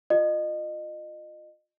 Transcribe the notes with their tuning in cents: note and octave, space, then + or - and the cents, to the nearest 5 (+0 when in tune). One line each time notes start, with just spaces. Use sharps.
F4 +0 D#5 -30